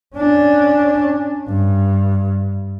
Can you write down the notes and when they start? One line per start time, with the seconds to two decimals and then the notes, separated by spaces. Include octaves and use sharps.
0.16 C#4 D4
1.49 G2